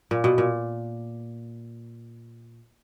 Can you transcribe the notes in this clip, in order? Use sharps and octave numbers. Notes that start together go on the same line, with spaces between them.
A#2
B2
A#2